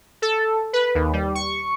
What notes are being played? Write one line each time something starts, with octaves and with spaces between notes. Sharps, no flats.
A4
B4
D#2
G3
C#6